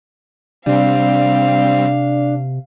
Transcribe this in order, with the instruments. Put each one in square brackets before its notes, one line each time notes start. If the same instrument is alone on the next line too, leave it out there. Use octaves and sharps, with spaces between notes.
[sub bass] C3 [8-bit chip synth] G3 C4 [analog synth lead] D4 [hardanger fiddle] F5